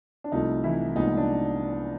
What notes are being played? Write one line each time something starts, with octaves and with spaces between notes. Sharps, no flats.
D4
C2 C3 F3 A3 D#4
E3 E4
C2 A#2 F3 G#3 B3 D#4
D4